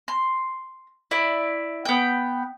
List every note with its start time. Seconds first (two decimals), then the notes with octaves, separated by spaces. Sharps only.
0.08 C6
1.11 E4 D5
1.85 B3 G5